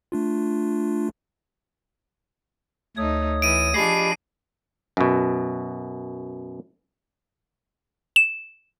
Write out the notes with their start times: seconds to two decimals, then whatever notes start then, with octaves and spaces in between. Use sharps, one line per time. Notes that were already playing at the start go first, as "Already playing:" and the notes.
0.12 A3 D4 F4
2.97 D2 A3 D#4 C#5 D#6
3.42 E3 D7 D#7
3.74 F3 D4 G4 G#4 D#5 B5 C7
4.97 F#2 B2
8.16 E7